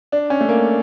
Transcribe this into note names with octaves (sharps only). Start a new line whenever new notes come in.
D4
C#4
A3
A#3